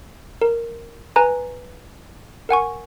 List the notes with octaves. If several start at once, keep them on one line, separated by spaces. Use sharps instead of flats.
A#4
B4 G#5 A#5
A#4 F#5 G#5 C#6